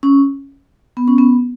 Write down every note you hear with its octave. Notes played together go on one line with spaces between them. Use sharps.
C#4
B3
C#4
B3